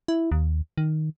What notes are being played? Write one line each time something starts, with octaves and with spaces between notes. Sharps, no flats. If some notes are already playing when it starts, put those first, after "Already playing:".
E4
D#2
D#3